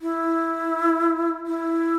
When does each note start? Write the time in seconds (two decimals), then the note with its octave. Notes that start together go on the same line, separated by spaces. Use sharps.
0.02 E4
1.47 E4